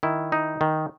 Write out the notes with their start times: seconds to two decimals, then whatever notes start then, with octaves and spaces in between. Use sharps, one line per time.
0.03 D#3 E4
0.32 D#4
0.61 D#3